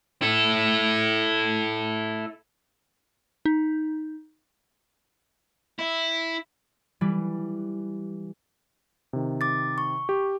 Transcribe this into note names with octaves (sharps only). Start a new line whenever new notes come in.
E4 A4
D#4
E4
E3 G3
C3 D#3
D6 A6
C#6
G4